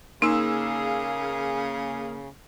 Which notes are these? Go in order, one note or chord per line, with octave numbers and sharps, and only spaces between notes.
C#3 A#3 D#4 G#4 F5 E6